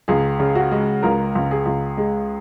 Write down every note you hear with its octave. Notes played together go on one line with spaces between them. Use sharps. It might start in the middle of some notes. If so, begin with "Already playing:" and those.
C#2 G#4
C#3
F#4
G#3
C#2 A#4
C#2
G#4
C#2
G#3